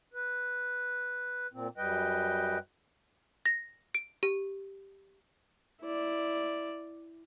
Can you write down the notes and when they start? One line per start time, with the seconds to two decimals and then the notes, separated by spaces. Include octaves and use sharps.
0.14 B4
1.53 A#2 C4
1.77 F#2 G3 B4 D#5 G5
3.46 A#6
3.95 D7
4.23 G4
5.81 E4 D5